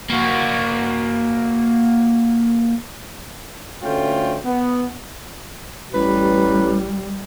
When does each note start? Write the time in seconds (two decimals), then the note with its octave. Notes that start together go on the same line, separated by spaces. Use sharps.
0.10 A#3 F#4
3.83 D2 A3 C#4 F4 G5
4.45 B3
5.94 A1 G3 B4